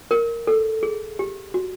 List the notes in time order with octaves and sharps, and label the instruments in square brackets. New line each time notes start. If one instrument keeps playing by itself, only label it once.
[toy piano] A#4
A4
G#4
G4
F#4